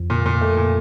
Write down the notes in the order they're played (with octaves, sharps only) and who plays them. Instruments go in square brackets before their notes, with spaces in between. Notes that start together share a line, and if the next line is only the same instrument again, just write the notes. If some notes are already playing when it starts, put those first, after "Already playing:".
Already playing: [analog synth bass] F2
[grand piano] A#2
A#2
A3
A#2